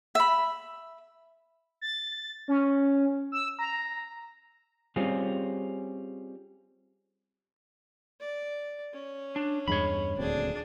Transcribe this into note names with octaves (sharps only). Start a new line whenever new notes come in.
E5 B5
A6
C#4
E6
A#5
G3 C4 C#4 F4 G#4
D5
C#4
D4
E2 G2 G#3 C#5 B5
D#1 D2 C4 D4 G#4